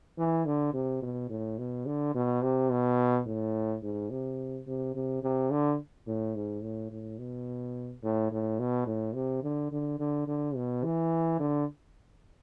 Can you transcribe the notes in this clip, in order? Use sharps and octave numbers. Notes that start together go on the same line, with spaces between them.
E3
D3
C3
B2
A2
B2
D3
B2
C3
B2
A2
G#2
C3
C3
C3
C3
D3
A2
G#2
A2
A2
B2
A2
A2
B2
A2
C3
D3
D3
D3
D3
B2
E3
D3